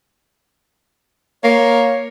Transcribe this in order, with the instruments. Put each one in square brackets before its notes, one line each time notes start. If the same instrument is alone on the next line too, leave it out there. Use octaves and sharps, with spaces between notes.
[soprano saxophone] A#3 [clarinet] C#5